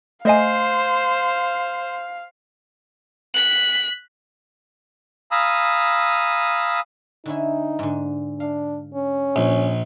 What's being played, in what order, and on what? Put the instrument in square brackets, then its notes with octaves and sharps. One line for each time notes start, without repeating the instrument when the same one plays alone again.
[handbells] A3 D#5 G#5 [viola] C5 [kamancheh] F5
[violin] F#6 B6
[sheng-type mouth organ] F5 G#5 A#5 B5 D#6 E6
[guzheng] D3 C#4 E4 [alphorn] D#4
[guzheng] G#2 D3
[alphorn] D4 [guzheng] F5
[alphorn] C#4
[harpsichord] A#1